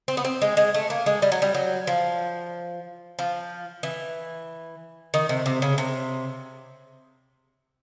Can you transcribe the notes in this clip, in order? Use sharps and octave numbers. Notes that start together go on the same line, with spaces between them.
C4
B3
C4
G#3
G#3
A3
A#3
G#3
G3
F#3
G3
F#3
F3
F3
E3
D#3
C3
C3
C#3
C3